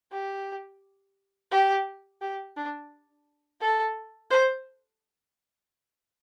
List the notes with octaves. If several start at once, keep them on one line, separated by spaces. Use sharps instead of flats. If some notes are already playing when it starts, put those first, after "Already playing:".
G4
G4
G4
D4
A4
C5